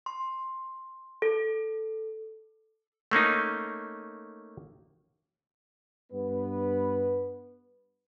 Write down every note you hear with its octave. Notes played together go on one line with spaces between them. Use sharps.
C6
A4
A3 A#3 C#4 D#4
G2 B3 B4